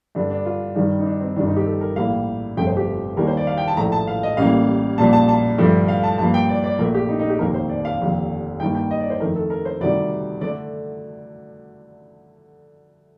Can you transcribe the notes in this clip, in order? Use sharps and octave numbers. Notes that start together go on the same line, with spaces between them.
G2 D3 G3 D4
D4
F4
G2 D#3 G3
D#4
D4
C4
G1 G2 D#3 D4
D#4
G4
A4
A#4
A#1 A2 G3 A#3 F5
G1 F2 C3 F3 A3 G5
C5
G4
D#2 D#3 G3 A#3 A#4
C5
D5
F5
G5
A5
A#1 A2 F3 A3 A#5
A5
F5
D#5
A1 A2 G3 A#3 F5
A#1 A#2 G3 A#3 A5
A5
A5
G2 D3 F3 A3
F5
A5
G2 F3 A#3 A5
G5
D5
D5
A#1 A#2 A3 A#4
G4
D#4
D#4
G4
F1 D#2 D#3 A#3 A#4
C5
D5
F5
F1 D#2 D3 F3
G2 D#3 A#3 G5
G5
D#5
D5
C5
F2 D#3 A3 A#4
A4
A#4
C5
D2 C3 D#3 G3 D5
D3 A3 D5